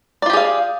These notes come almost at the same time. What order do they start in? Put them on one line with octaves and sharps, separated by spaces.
D5 F4 G4 G#4 F5